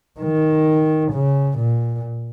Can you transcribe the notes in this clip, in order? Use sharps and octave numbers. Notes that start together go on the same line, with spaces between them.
D#3
C#3
A#2